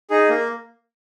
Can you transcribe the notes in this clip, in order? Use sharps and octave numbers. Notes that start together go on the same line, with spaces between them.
D#4 G#4
A#3